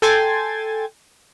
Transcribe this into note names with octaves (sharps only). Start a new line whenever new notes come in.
A4 G5 G#5 C6 G#6 A6